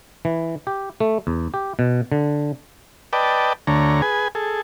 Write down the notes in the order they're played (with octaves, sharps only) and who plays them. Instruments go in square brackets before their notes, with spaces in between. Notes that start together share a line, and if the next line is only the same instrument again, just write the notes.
[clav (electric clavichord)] E3
G4
A3
E2
G4
B2
D3
[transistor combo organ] B4 D5 D#5 G5 A5
D2 D3 A3 C#5 A#5
G#4 B4 G#5
G#4 A4